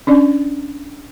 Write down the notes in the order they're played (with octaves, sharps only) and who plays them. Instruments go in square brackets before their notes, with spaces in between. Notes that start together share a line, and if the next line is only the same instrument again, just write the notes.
[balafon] C#4 D4 D5